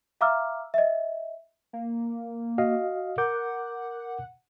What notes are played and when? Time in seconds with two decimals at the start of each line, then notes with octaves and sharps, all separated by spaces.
0.21 E5 F5 A#5 D6 E6 F6
0.74 D#5 E5
1.73 A#3
2.58 F#4 D#5 F5
3.18 A#4 F#5 D6 G6